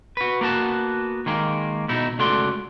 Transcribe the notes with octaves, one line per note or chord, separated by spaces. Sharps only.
F#4 B4
A#3 B3 F#4 A5
D#3 G#3 A#3
B2 D#4 E4
C#2 A3 F#4 A4 D5 C6